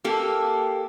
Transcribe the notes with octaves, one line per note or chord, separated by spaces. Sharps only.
A#3 G4 A4